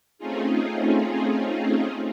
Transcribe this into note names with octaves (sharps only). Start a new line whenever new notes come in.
A3 C4 C#4 D#4 F4 G#4